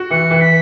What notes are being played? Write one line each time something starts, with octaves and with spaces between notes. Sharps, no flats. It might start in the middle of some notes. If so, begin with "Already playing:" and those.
Already playing: F#4
E3 C#7
E3
B6